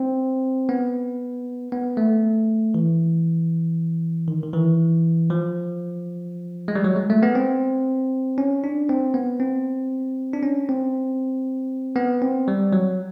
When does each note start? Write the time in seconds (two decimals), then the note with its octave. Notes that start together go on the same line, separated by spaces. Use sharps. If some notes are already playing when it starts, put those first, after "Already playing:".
Already playing: C4
0.69 B3
1.72 B3
1.97 A3
2.74 E3
4.28 D#3
4.43 D#3
4.53 E3
5.30 F3
6.68 G#3
6.75 G3
6.84 F#3
6.96 G#3
7.10 A3
7.23 B3
7.35 C4
8.38 C#4
8.64 D4
8.89 C4
9.14 B3
9.40 C4
10.33 D4
10.43 C#4
10.69 C4
11.96 B3
12.22 C4
12.48 G3
12.73 F#3